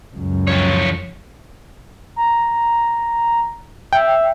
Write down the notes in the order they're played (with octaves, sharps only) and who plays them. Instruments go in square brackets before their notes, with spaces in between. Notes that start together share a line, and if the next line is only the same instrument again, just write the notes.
[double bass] C#2 F#2
[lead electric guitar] F3 C#5
[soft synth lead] A#5
[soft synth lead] E5 [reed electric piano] G5